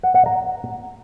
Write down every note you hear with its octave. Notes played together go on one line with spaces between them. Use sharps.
F#5
F#5
A#5